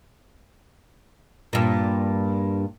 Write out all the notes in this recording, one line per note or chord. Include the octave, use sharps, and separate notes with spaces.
G2 A#2